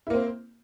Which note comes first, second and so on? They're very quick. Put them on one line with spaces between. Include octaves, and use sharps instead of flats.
E4 A#3 C4